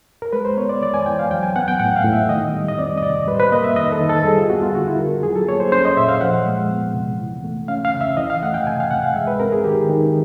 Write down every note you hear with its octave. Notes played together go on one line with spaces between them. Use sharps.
A#4
G#3 B4
C5
B3 C#5
D5
E3 D5
G#5
E3 G5
F5
F#3 G5
G#5
B3 F#5
G5
A2 F#5
F5
A2
E5
D#3 D#5
G3
D#5
C4 D5
D#5
C3 D5
G3 B4
C5
B4
A#3 D#5
E5
D#3 D#5
A4
D#3
A4
G3 G#4
F4
B3 F#4
F4
D3 F#4
E4
D3 A#4
F#3 G#4
A4
A#3 C#5
C5
C#4 C5
D#5
A#2 E5
F5
F3 F#5
G#3
B3
C3
E3
A3
C#4 F5
F5
C#3
E5
E3 D#5
F5
A3 F#5
G5
C3 G#5
F5
C3 F#5
F5
G#3 E5
B4
C4 A#4
G#4
D#3 G4
D#3